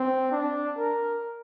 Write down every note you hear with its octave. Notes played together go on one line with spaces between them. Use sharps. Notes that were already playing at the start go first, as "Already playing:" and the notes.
Already playing: C4
D4
A#4